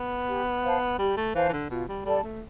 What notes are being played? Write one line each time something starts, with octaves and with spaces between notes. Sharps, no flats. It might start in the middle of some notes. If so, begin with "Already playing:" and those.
Already playing: B3
G4
C5 F5 A5
G3 G4
A3
E3 C5 F5 A5
E3
D3
B2 F4
G3
G3 A4 D5 A5
A3